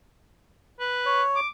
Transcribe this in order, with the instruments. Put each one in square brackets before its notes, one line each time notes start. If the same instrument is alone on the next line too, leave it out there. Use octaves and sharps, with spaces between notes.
[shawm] B4
[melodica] C#5
[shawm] D6